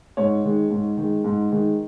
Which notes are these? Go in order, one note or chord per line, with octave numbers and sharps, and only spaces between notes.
G#2 C#5
D#3 G#3
G#2
D#3
G#3
G#2
D#3 G#3